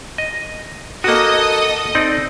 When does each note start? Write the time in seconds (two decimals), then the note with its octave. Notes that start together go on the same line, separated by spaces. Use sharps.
0.18 D#5
1.04 A#3 F#4 A4 D#5 D#6
1.95 C4 D#4 D5